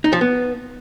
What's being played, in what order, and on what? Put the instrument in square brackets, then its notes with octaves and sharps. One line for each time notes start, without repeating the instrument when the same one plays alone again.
[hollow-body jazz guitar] D#4
F3
B3